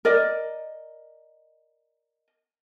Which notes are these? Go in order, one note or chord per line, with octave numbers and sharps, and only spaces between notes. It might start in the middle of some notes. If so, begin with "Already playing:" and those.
A#4 D5 D#5